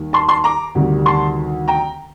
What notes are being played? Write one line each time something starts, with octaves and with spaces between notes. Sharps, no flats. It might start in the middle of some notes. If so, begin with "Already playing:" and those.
Already playing: D#2 D#3 G3
A5 C6
A5 C6
A#5 D6
D2 C3 D#3 G3
A5 C6
G5 A#5